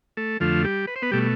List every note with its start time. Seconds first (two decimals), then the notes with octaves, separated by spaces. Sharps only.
0.17 A3 A4
0.40 F2 D3 F3 A3 F4
0.64 G3 G4
0.87 B4
0.96 C5
1.02 B3 B4
1.11 B2 G3 A3 G4